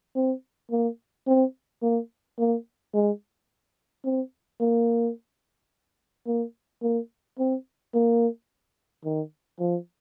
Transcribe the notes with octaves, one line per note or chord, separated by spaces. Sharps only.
C4
A#3
C4
A#3
A#3
G#3
C4
A#3
A#3
A#3
C4
A#3
D#3
F3